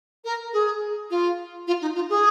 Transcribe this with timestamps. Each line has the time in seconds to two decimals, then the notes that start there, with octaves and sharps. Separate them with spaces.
0.24 A#4
0.53 G#4
1.10 F4
1.67 F4
1.81 D#4
1.95 F4
2.09 G#4